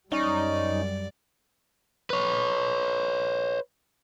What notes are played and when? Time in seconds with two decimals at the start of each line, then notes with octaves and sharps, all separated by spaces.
0.12 F#2 G3 C#4 D#4 C#5 D5
2.10 B4 C#5